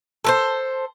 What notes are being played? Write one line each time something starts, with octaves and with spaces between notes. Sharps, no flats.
A4 B4 C5